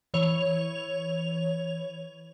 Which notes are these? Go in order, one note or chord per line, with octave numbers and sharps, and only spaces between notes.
E3 C#5 F7